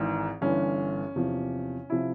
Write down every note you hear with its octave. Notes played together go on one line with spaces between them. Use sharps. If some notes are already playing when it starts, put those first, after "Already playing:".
Already playing: G#1 G#2 E3
G1 G2 E3 C#4
E2 C3 F3
C3 F3 E4